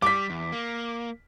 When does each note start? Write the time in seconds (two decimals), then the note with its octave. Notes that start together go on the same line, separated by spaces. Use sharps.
0.02 G3 D6 B6
0.30 E2
0.52 A#3